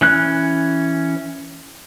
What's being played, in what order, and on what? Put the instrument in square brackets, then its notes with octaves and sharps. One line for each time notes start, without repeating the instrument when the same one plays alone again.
[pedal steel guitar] E3 C#4 F#6